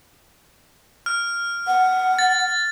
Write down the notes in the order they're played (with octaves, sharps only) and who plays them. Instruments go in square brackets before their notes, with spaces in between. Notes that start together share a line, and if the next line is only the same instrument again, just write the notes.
[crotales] F6
[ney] F#5
[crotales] A6